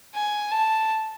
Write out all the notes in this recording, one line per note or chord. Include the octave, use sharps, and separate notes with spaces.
G#5
A5